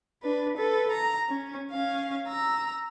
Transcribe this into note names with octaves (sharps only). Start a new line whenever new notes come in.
D4 B4
A4 B4
A#5
C#4
C#4 F5
A#5 E6